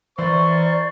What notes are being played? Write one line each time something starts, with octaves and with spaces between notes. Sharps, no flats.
E3 A#4 C5 D5 C#6